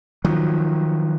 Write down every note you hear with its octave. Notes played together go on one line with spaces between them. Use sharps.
D#3 F3 F#3